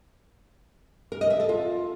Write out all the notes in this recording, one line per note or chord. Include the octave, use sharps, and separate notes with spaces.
A#4
D#5
E5
A4
F4